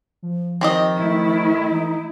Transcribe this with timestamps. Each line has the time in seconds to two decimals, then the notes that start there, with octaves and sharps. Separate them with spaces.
0.23 F3
0.61 D#3 C4 G4 D#5
0.98 A3 E4
1.70 E3 D#4